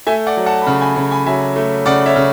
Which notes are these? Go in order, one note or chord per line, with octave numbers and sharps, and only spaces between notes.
A3 E5 G#5
D5 F#5
F#3
F#5 A5
B5
C#3 F#5 A5
G#5 B5
C#3
G#5 B5
F#3 E5 G#5
A3
C#3 D5 F#5
C#5 E5
C#3